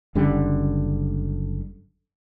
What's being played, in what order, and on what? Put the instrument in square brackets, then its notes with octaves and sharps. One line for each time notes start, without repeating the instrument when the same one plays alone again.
[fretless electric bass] F#1 D3 G3 C#4